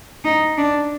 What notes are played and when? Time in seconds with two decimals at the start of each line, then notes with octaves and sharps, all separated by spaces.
0.24 D#4
0.57 D4